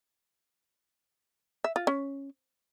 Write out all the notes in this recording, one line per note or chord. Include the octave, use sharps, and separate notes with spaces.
E5
F4
C#4